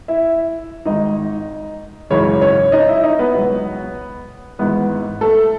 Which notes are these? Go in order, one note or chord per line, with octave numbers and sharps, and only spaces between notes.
E4 E5
G#1 G#2 D#3 D#4 D#5
G#1 F#2 C#3 E3 C#4 C#5
C#4 C#5
D#4 D#5
E4 E5
D#4 D#5
B3 B4
C#2 B2 F#3
G#1 G#2 E3 B3 B4
A3 A4